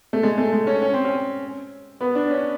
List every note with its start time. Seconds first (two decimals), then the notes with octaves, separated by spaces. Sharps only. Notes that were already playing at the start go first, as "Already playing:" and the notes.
0.13 A3
0.23 G#3
0.38 A3
0.53 G#3
0.67 C#4
0.82 C#4
0.94 C4
1.05 C#4
2.01 B3
2.15 D4
2.30 C#4